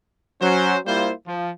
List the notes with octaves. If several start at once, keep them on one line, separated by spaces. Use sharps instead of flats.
F#3 C#4 C5
G3 A#3 E4 F4 C5
F3